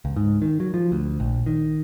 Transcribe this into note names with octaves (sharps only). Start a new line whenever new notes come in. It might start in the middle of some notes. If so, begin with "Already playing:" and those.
C#2
G#2
D#3
F#3
F3
D2
A#1
D#3